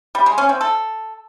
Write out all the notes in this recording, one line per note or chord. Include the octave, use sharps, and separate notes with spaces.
G3
G#3
C#4
C4
A4